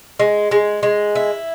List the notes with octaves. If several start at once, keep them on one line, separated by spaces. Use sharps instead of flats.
G#3
G#3
G#3
E4